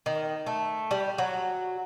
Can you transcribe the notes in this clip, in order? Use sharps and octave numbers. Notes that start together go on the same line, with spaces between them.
D#3
A3
G3
F#3